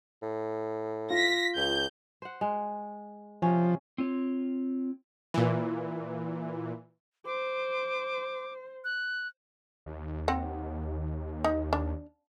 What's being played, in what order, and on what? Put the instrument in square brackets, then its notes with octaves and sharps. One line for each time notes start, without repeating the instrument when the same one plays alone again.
[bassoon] A2
[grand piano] F4 [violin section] A#6 B6
[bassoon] C#2 [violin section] G6
[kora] C5 F#5
G#3
[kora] C3 C#4 [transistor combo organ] F3
[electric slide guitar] C4 F4 C#5
[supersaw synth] A#2 E3
[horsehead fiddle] C5 [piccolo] D6
[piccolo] F#6
[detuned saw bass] D#2
[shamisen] C4 F#5
D#4
D4